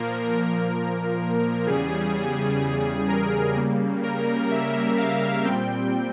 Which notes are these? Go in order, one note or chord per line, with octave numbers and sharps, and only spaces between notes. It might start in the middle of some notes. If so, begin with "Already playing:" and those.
Already playing: A#2 F3 A#3 A#4
A#4
E2 C#3 G3 G#4
A#4
C#3 G3 A#3
A#4
E5
F5
A#2 G3 C4 G5